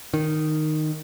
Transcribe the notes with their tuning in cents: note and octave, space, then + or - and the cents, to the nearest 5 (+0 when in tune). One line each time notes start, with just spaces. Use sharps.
D#3 -10